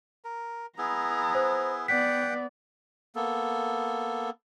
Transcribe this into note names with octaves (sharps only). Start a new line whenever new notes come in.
A#4
B3 E4 G#4 A#5
C5
B3 D5 F#5 G5 B6
A#3 B3 A4